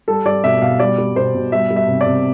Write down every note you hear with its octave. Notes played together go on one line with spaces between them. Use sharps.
G3 A4
G3 D5
B2 E5
B2 F5
G3 D5
G3
B2 C5
B2
G3 E5
G3
E5
C3
D5
C3